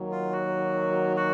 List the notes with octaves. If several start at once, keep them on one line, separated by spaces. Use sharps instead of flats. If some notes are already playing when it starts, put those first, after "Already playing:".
Already playing: D#2 D#3 F#3
F4
F#4
F#4